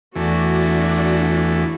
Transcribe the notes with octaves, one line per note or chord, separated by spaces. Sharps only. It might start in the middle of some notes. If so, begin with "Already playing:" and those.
E2 E3 A3 D4 F#4